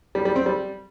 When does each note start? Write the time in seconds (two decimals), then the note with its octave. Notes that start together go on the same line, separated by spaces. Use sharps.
0.15 G3
0.25 G3
0.36 C4
0.46 G3